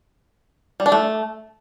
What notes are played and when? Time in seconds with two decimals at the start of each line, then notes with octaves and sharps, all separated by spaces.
0.80 G3
0.86 D4
0.92 A3